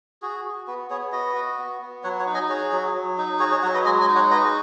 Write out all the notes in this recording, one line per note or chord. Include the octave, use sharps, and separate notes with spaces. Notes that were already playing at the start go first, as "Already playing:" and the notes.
F#4 G#4
F#4
B3 F#4 B4
B3 G#4 C#5
F#4 B4 D#5
F#4
B3
B3
F#3 C#5 F#5
C#5 F#5
D#4
D#5 G#5
F#4 G#4 C#5
F#3
F#3
D#4
F#4 G#4 C#5
G#4 C#5
F#3 C#5 F#5
B4 D#5
G#3 D#5 G#5
D#5 G#5
D#4
C#5 F#5
F#4 B4 D#5